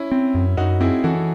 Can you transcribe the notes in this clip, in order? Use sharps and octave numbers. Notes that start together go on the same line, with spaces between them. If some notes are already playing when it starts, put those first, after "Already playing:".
Already playing: C#4 E4
C4
F#2
F#2 D#4 F#4
C4 E4 G#4
E3 F#4 A4